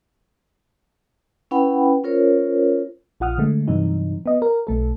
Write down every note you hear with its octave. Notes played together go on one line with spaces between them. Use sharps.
C#4 E4 B4 F#5 G5 B5
C#4 F4 A#4 C5 C#5
A#1 F4 F#5 D#6 F6
D3 G#3 A3
G2 C3 E3 F#3 D#4
B3 D#5
A#4
B1 A3 A4